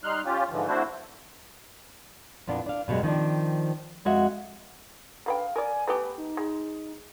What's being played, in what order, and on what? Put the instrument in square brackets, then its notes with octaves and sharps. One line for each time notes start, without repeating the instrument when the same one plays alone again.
[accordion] G3 D#4 C6 F6 F#6
C#4 F4 G4
G#2 D3 E3 F3
A3 C4 D4 E4 F#4 C5
[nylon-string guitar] F2 A#2 B3 D4
D4 F5
F#2 B2 D3 G3 G#3
D#3 F3 C4 D4
F2 G#3 F#4 E5 F#5
[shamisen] D3 B4 G5 [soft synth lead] F5
[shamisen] A#4 D5 [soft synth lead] G#5
[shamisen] A3 B3 G4 [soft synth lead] B4
[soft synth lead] D#4
[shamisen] G#3